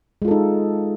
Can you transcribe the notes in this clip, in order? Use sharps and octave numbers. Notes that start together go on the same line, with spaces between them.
G#3 D#4 F4 A4